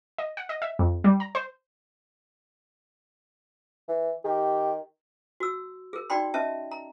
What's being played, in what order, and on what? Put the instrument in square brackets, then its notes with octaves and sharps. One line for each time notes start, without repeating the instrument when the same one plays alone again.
[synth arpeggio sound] D#5
F#5
D#5
E5
F2
G3
A#5
C5
[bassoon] E3
[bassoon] D#3 [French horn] G4
[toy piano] F#4 E6
G#4 A#4
D#4 F#4 D5 G5 B5 C6
C#4 D#5 E5 A5
A#5